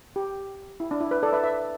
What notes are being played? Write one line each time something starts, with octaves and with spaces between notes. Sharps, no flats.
G4
E4
D4
E4
B4
A4 D5
B4 E5
B4 E5